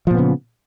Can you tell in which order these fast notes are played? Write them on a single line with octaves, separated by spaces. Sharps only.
F3 A#2 B3 C#3